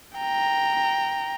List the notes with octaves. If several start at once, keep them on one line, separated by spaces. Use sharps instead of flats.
G5 A#5